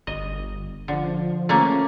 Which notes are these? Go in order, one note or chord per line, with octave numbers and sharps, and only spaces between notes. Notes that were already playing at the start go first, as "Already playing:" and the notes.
G1 D#5
D3 F3
A3 A#3 C#4